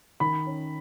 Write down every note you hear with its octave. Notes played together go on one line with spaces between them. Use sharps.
D#3 B5
C#4